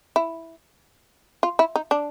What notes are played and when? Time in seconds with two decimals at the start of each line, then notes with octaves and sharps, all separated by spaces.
0.16 E4
1.43 F4
1.59 E4
1.76 D#4
1.91 D4